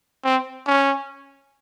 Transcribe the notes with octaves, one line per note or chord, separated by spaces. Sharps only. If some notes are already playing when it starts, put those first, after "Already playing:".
C4
C#4